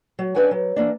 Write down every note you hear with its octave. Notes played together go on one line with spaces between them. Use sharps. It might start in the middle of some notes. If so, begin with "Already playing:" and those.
F#3
C#4 D4 B4 C#5 F#5 G#5
F#3
E3 F3 A#3 D4